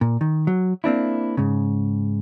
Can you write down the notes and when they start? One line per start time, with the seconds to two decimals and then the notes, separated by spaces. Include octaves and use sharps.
0.01 A#2
0.21 D#3
0.47 F#3
0.84 A#3 C4 D4 E4
1.37 G#2 C#3